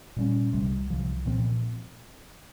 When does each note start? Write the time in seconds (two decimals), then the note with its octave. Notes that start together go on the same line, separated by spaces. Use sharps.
0.16 A#2 G3 A#3 C#4
0.53 C2 C3 G3
0.90 C2 C3 F3
1.26 A#2 F3 C4